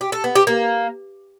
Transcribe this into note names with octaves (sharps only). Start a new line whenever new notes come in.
G4
A4
B3
G4
A#3